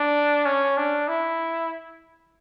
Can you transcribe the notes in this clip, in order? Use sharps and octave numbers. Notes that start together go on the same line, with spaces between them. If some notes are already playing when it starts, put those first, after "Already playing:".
Already playing: D4
C#4
D4
E4